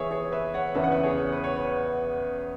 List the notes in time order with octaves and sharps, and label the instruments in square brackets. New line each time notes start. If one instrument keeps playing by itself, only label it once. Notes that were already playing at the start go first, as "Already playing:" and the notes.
Already playing: [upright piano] E3 B3 G#4 C#5 E5
G#4 C#5
B4 E5
C#5 F#5
E2 C#3 E3 B3 E5
F#5
B4 E5
G#4 C#5
B4
C#5
B4